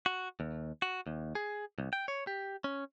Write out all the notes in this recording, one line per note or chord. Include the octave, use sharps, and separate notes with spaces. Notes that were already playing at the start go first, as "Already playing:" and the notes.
F#4
D#2
F#4
D#2
G#4
C2
G5
C#5
G4
C#4